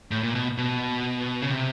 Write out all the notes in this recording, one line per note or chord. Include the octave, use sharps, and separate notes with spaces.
A2
A#2
B2
B2
C#3
C3